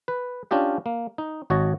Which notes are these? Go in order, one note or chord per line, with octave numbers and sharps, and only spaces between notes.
B4
C#4 D4 F4 G4 D#5
A#3
D#4
G#1 F#4 C#5 D#5 A5